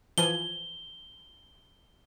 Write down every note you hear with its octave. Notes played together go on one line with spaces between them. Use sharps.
E3 F3 G#5 G7